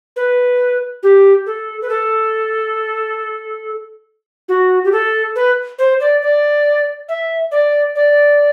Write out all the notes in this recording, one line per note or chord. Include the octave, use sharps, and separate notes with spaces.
B4
G4
A4
B4
A4
F#4
G4
A4
B4
C5
D5
D5
E5
D5
D5